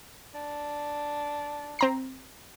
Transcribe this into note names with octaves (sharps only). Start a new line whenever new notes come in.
D4
C4 A#5 C7